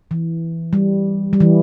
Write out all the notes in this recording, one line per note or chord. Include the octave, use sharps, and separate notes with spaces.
E3
G3
G3
E3